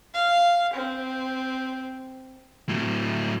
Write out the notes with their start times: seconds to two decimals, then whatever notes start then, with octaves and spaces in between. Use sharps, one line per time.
0.14 F5
0.73 C4
2.69 A2 F#3